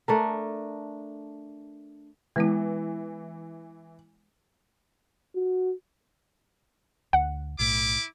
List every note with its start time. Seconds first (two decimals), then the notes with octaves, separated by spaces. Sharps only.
0.08 A3 D4 A#4
2.36 E3 G#3 B3 E4
5.36 F#4
7.13 D2 F#5
7.59 B1 A2 E4 D6